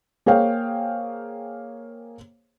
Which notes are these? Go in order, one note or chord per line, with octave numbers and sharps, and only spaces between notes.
A#3 G#4 C5 C#5 F5 G5